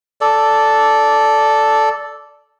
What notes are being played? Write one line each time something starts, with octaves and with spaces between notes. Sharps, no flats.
A4 D5